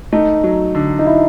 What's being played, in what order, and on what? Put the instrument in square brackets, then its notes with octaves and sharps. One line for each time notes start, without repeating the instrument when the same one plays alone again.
[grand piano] A3 [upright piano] D#4
[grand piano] F#3
D3
[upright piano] D#4
E4